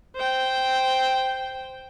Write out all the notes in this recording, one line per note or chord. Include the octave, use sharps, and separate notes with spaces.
C5 G5